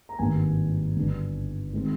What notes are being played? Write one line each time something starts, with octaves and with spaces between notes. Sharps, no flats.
A#5
G#1 G2 D#3 G3 A#3 G#5
G1 G2 D3
D#3 G#3 C4